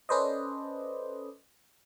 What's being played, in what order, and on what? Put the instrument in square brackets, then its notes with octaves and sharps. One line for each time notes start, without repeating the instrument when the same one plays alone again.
[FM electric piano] C#4 A4 B4 C5 D5 D#5